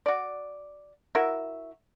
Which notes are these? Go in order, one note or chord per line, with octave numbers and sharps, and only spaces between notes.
F#4 D5
E4 F#4 A#4 E5